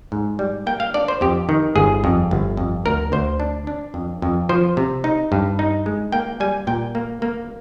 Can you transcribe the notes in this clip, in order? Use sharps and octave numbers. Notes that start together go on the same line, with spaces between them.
G#2
G3
A#3 G5
F5
D4 D5
C5
F2 G4
D#3
G1 G#4
F2
G1
F2
D2 A#4
D2 C5
D4
D4
F2
F2
F3 C5
C3
D#4
G2
D#4
G#3
A#3 G5
G3 G#5
A#2 G5
A#3
A#3